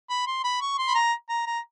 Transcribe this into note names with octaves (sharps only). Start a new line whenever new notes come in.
B5
C6
B5
C#6
C6
B5
A#5
A#5
A#5